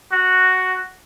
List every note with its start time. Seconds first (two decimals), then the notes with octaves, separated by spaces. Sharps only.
0.13 F#4